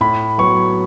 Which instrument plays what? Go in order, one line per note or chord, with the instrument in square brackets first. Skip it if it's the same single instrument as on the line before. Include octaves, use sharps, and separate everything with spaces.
[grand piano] A2 B5
F#3 B3 C#6